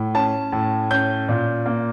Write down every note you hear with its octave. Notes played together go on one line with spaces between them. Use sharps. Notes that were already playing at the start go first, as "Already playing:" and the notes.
Already playing: A2
C#4 A5
A2
C#4 G6
A#2
A#3